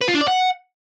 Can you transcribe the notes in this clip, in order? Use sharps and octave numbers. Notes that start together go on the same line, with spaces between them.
B4
F4
D4
D5
F#5